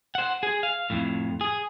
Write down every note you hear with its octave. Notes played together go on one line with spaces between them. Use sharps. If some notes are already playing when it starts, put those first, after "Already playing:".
C5 F#5
G#4
F5
F2 A2
G#4